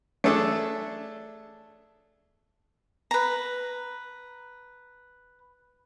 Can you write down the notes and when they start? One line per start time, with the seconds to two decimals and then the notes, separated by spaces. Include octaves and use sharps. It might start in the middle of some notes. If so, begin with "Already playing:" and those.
0.24 A3 D4 G#4 A4 A5
3.11 B4 A#5